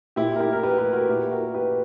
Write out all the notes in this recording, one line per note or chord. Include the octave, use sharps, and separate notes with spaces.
A#2 E4 G4
A#4
E4 G4
A#4
G4 B4
G4 B4
F#4 A#4
A#2 E4 G4
F#4 A#4
G4 B4